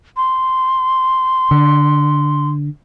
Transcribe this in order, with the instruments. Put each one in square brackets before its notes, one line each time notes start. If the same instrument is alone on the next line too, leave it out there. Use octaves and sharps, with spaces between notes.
[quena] C6
[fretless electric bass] D3